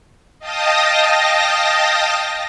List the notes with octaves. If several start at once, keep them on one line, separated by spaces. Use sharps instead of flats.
D#5 F5 G5 A5 D#6 A#6